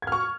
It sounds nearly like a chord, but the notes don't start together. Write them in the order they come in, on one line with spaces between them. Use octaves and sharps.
G#6 F6 C#6